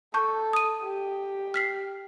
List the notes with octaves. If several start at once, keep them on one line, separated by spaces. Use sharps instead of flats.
A4 A5 C#6 G6
D#6 D#7
G4
F6 B6 C7